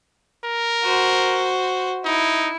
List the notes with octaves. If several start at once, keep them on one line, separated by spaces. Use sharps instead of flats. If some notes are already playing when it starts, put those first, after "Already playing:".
A#4
F#4 C5
D#4 E4